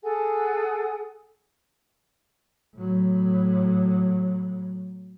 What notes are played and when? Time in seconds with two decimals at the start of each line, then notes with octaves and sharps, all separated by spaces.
0.04 G#4 A4 F#5 G#5
2.76 A2 F#3